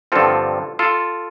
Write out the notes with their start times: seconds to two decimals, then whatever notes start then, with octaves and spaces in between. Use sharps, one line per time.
0.12 G2 D3 F3 C4 F4 A4
0.79 F4 A4